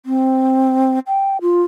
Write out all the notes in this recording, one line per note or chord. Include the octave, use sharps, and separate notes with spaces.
C4
G5
F4